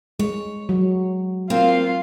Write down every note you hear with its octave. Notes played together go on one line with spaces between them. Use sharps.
G#3 C#5
F#3
A#3 C4 F4 F5